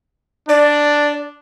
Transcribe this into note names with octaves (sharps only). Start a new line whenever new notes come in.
D4 D5